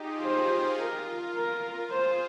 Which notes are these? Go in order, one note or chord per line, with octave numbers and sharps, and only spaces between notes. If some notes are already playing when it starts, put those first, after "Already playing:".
Already playing: D#4 F4 G4 G#4
F4 C5
A#4
F4 A#4
F4
F4 G#4 C5